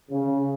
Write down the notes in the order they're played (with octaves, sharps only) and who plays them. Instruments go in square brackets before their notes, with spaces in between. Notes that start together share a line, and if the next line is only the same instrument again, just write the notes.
[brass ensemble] C#3